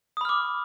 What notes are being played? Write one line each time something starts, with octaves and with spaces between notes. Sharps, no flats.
B5 D6 D#6 F6